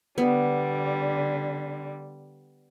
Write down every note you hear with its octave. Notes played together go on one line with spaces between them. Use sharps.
D3 G3 B3